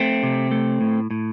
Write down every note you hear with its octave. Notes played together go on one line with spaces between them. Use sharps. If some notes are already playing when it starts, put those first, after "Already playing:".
Already playing: A3 C4
C3
A3
A2
A2